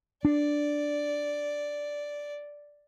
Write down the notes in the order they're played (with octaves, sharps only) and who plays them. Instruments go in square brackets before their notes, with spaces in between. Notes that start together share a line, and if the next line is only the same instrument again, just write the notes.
[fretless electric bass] D4 [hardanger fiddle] D5